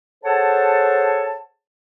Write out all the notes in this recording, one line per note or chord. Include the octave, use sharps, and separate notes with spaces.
G#4 A4 C5 C#5 F#5 A5